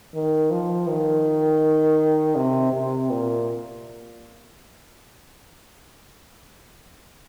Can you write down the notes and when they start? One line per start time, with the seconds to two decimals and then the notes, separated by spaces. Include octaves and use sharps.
0.14 D#3
0.50 F3
0.88 D#3
2.35 C3
2.73 C3
3.10 A#2